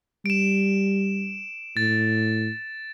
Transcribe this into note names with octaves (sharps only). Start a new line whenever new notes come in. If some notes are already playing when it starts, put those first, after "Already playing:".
G3 D7 E7
A2 A6